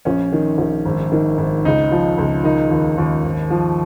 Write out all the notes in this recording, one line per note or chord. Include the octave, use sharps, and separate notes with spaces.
A#1 C#4
D#3
A#1
G#1
D#3
G#1
C#2 D#4
F3
C#2
D#3 D#4
D#2
D#2
G#1
F3